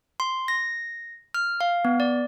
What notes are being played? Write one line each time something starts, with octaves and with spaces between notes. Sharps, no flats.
C6
A#6
F6
F5
B3
D5